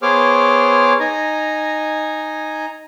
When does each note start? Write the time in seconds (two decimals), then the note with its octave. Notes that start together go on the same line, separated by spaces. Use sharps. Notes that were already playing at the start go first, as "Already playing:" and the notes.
0.02 B3 G#4 C5 C#5 D6 F6
1.00 D#4 G#5 A#5